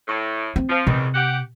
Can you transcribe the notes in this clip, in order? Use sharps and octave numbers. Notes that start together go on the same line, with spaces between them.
A2
C4
F3
E2 G#2 C3 D#3
G4 F#5